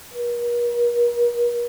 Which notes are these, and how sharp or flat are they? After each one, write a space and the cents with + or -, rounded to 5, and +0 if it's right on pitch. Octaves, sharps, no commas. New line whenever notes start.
A#4 +45